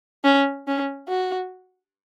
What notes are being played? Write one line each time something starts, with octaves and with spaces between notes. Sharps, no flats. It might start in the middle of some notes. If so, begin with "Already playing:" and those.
C#4
C#4
F#4